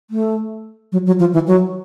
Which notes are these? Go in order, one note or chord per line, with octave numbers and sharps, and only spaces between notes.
A3
F#3
F#3
F3
E3
F#3